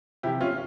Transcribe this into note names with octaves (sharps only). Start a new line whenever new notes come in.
C3 E3 E4 G4
C#4 F4